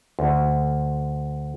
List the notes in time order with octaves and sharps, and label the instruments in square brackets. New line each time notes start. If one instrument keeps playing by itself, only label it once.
[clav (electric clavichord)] D2